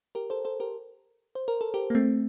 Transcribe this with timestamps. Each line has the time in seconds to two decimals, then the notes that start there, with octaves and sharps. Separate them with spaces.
0.15 G4 A#4
0.30 A4 C5
0.45 A4 C5
0.60 G4 A#4
1.35 C5
1.48 A#4
1.61 A4
1.74 G4 A#4
1.90 A#3
1.95 A3 C4